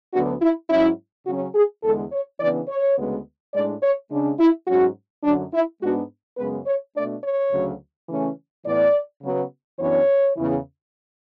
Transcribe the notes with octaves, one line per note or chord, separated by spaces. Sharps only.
D2 D3 F#3 B3 D4 F#4
E4
G#2 F#3 C#4 E4
C#3 F#3 C#4 F#4
G#4
E2 D3 G#3 A4
C#5
C#3 E3 B3 D4 D5
C#5
D2 C#3 G#3 B3
A2 G#3 D4 D5
C#5
C#3 G#3 D4
E4
G#2 F#3 C#4 F#4
F#2 D3 F#3 D4
E4
G#2 G#3 B3 D4 F#4
F#2 C#3 G#3 B3 B4
C#5
B2 A3 D4 D5
C#5
D2 C#3 F#3
C#3 E3 A3 C#4
A2 E3 B3 D5
C#3 F#3 B3
F#2 E3 B3 D4 C#5
E2 C#3 E3